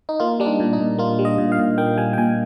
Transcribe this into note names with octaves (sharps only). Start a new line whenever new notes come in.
D#4
A#3 F4
G3 D4
D#4
A#2
D#4
A#2
A#3 F4
G3
D#5
A#2
F5
A#2
A#3 G5
G3 G#5
G5
A#2 G#5